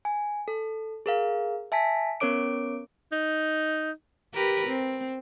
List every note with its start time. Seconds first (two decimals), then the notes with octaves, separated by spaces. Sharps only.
0.05 G#5
0.48 A4
1.06 G#4 A#4 F5
1.72 E5 G#5 A5 B6
2.20 B3 C#4 A#4 C#5 D6 D7
3.12 D#4
4.33 G4 A#4 B4
4.66 C4